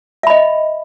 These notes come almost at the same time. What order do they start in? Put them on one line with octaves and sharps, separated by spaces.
E5 B5 D#5